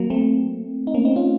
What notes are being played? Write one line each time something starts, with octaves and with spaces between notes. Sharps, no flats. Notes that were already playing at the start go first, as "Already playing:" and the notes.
Already playing: F#3 A#3
A3 C4
D#4
A#3 C#4
C4 D#4
C#4 F4